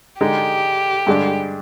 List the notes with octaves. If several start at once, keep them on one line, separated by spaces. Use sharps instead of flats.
D3 G#3 D#4 G4
G2 D3 G#3 D4